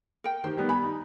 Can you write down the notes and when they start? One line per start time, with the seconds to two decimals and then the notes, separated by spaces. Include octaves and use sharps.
0.24 A#4 G5
0.44 D#3 G4 C5
0.57 D#3 G3 B3
0.69 G#5 B5
0.84 D#4